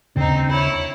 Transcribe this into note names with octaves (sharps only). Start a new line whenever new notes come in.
D#2 C#3 C4 D4 D#4
E4 C#5